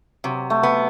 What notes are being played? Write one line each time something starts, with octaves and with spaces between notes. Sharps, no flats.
C3 F#3
A3
B3